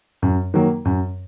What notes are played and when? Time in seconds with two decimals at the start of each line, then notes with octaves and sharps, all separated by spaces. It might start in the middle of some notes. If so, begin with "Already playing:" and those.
0.22 F#2
0.54 D#3 F#3 A#3
0.85 F#2